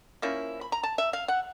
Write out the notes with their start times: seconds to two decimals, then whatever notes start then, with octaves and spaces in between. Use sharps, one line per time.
0.22 F3 A#3 C#4 E4
0.61 B5
0.72 A#5
0.83 A5
0.98 E5
1.13 F5
1.28 F#5